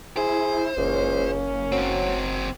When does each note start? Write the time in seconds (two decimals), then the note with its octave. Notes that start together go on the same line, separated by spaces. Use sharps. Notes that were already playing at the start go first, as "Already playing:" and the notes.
0.17 E4 G#4 C5
0.77 F#1 C#2 A#3 C#4
1.72 F#3 C4 F#4